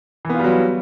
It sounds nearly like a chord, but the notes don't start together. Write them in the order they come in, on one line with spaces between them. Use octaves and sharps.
E3 B3 F4 G3 F#3